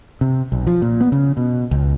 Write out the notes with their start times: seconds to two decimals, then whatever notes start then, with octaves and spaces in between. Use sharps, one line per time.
0.21 C3
0.52 B1
0.67 F3
0.82 A#2
1.01 B3
1.12 C#3
1.37 B2
1.71 C#2